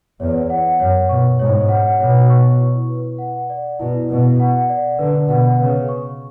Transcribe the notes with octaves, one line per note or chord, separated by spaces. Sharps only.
E2 C#5
F#5
F#2 C#5
B2 C#6
G#2 C#5
F#5
B2 C#5
C#6
E4
B4
F#5
D5
B2 E4
B2 B4
F#5
D5
D3 B4
B2 F#5
C#3 B4
C#6